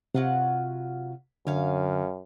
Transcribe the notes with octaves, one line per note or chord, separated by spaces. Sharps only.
C3 F#3 F4 F#5
F#2 D3 C#4 F5